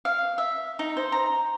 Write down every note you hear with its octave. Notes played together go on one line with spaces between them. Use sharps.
F5
E5
D#4
C5
A#5